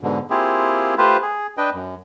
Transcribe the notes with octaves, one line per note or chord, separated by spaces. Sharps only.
G#2 B2 D3
A#3 C4 E4 F4 G4 G#4
A3 F4 G4 B4 C5
G#4
D4 B4 D#5 G5
F#2